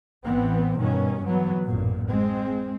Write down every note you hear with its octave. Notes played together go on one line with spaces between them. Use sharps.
A1 E3 B3 C4
G2 B2 D#3 C#4
E3 F#3 B3
A1 F#2 A#2
G#3 C4